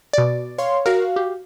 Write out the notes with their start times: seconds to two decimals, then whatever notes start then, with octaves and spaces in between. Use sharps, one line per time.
0.13 B2 D5
0.58 C#5 F5 C6
0.86 F#4 A#4 F5
1.16 G4